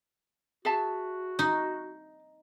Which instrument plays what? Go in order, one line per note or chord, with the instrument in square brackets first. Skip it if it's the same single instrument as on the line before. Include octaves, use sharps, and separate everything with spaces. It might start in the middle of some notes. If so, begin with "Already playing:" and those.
[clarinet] F#4 [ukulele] G#4 E5 A5
[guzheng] D#4